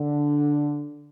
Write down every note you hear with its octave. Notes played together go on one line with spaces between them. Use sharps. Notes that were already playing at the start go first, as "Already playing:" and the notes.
Already playing: D3